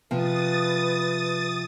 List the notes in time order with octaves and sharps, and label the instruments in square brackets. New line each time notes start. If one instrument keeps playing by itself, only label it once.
[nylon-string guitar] C3 F3 [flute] B4 [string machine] D#6 A6